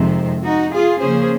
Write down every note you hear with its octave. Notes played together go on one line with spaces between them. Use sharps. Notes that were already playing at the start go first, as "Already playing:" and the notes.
Already playing: F2 C3 D#3 G#3 C4
D#4 F#4
F4 G#4
C#3 F3 A#3 C#4 G#4 C5